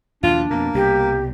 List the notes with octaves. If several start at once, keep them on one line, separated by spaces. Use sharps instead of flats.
D#2 B2 F3 D4 F4
F2 B2 A#3
C2 B2 G3 G4